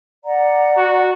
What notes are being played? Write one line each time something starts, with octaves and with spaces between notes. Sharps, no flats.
D5 F#5 A#5
F#4